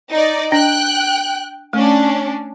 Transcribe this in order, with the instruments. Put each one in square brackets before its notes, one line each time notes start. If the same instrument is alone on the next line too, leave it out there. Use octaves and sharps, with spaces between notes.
[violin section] D#4 D5
[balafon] D4 [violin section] G5 F#6
[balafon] A3 [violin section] C#4 D4